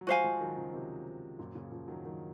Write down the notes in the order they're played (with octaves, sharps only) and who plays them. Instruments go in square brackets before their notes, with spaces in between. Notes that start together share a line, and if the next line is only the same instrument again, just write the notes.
[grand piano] F#3
[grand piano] F3 G#3 [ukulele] F#4 C5 F5 G#5
[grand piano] F3 G#3
D#3 F#3
C#3 F3
C3 D#3
F#2 A#2
A#2 C#3
C#3 F3
D#3 F#3
D#3 F#3